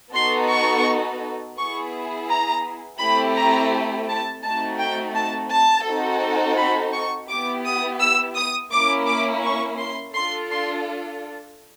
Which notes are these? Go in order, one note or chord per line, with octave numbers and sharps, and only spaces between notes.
B3 D#4 F#4 A4 C6
C#6
B3 E4 G#4 C#6
A#5
A3 C4 E4 G4 B5
A#5
A5
A3 C4 D#4 F#4 A5
G5
A5
A5
C4 D#4 F#4 A4
B5
C#6
B3 E4 G4 D6
D#6
E6
D#6
A#3 C#4 E4 D6
D6
C#6
C6
D4 F4 A4 C6
C6